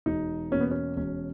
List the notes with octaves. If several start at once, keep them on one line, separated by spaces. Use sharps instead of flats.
E1 D#4
E2 B2 A#3 C#4
B3
C#4
E1 C#4